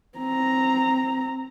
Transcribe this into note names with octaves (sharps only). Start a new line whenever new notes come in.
C4 A#5